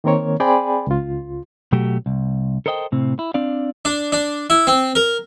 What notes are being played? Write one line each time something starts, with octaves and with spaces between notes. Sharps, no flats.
D#3 A#3 C4 A#4 C#5
C4 G#4 D5 G5 G#5 B5
C#2 F4
B2 F#3 A3 F#4 G4
C2
A4 A#4 C5 D#5 E5 G5
A2 C3 C4
E4
C4 D4 D5 F5
D4
D4
E4
C4
A#4